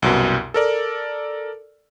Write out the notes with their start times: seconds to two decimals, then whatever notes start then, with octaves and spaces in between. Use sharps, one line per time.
0.02 C2 F#2 B2
0.54 A4 A#4 D5